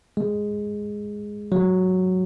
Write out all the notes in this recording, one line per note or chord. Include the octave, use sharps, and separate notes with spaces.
G#3
F#3